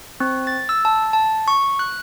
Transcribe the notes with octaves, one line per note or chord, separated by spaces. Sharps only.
C4
A6
E6
A5
A5
C#6
F#6